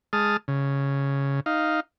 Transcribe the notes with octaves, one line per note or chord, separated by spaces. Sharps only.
G#3 A5 D#6 F6
C#3
D#4 F5